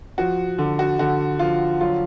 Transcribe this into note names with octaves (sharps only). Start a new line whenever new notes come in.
F3 F#4
D3
F#4
D3 F#4
F3 F4
F#3 F4